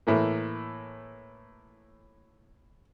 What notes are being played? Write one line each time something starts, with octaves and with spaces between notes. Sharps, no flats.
A2 E3 A#3